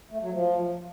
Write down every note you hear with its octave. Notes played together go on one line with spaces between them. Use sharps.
A3
F#3
F3